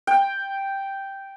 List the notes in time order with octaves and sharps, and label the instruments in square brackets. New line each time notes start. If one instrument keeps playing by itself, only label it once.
[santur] G5